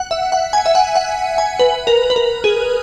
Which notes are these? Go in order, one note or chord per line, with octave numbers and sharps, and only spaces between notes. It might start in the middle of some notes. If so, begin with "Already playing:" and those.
Already playing: F#5
E5
F#5
G#5
E5
F#5
F#5
G#5
B4
A#4
B4
A#4
G#4